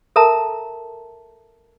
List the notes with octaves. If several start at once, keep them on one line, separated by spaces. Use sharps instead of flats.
A4 A#4 E5 A5 A#5